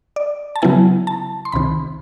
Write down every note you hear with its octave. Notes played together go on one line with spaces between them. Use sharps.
D5
A5
C#3 F#3 B3 E4 G#5
A5
C6
C2 C3 D#3 B5